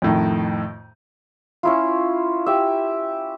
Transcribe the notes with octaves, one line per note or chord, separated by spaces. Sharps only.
F2 A2 D#3
C#4 E4 F4
G4 E5